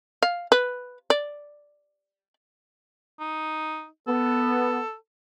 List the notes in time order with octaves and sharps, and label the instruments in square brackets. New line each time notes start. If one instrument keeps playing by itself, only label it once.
[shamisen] F5
B4
D5
[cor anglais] D#4
[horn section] B3 [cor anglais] A4